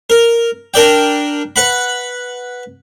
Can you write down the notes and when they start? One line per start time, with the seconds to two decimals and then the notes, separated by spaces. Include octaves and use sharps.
0.10 A#4
0.74 D4 A#4 D5 G5
1.56 B4 F#5 B5